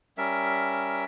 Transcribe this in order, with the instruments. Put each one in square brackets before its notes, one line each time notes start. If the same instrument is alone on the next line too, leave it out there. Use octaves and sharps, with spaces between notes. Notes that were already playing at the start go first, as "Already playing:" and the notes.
[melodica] G3 C#4 A#4 E5